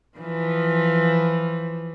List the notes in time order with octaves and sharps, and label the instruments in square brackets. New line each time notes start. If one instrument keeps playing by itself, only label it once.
[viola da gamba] E3 F3